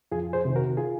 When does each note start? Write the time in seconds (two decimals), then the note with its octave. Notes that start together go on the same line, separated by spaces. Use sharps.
0.12 F2 F4 G#4
0.33 G#4 C5
0.45 C3 D#3
0.56 F#4 A#4
0.77 F4 G#4